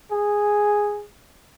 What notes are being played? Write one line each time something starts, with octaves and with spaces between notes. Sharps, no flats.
G#4